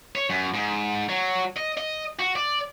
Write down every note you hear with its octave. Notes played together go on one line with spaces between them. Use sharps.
C#5
F#2
G#2
F#3
D#5
D#5
F#4
D5